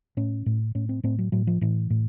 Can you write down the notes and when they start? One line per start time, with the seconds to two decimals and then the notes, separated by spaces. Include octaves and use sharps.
0.17 A2 C#4
0.46 A2
0.75 A2 C#4
0.89 C4
1.03 A2 C4
1.19 F#3
1.32 A2 F#3
1.47 F3
1.61 A2 E3
1.90 A2